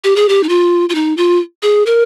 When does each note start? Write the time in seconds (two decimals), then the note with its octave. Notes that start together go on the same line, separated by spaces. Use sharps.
0.04 G4
0.16 G#4
0.29 G4
0.43 D#4
0.49 F4
0.89 F4
0.95 D#4
1.17 F4
1.63 G#4
1.86 A#4